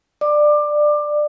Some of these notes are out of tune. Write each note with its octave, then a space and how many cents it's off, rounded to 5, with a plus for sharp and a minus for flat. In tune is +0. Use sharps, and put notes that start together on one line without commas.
D5 +15 D6 +20